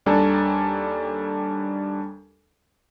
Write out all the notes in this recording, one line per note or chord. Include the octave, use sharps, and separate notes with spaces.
D#2 G3 D4 A4 G#5 A#5